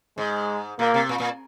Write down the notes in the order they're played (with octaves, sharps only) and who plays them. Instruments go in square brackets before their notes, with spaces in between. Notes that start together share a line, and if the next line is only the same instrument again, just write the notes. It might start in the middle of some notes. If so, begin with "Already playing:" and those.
[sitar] G#2 [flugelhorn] G#3
[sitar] A#2 [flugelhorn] A#3
[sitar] C3
A#2
A#2